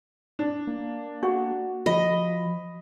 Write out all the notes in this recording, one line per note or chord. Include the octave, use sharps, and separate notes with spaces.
D4
A#3
F#4
F3 D#5 B5